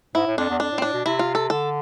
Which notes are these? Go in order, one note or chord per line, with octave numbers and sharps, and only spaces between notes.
G#2 E4
A2
F2 D4
E2
F2 D4
A2
C4
A2 D4
B2
C3 E4
F4
A4
D3 A4